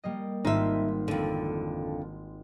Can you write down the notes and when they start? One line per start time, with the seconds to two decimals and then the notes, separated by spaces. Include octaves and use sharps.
0.04 G3 A#3 D#5
0.45 G#1 C4 D#4 F4 E5
1.08 F2 D3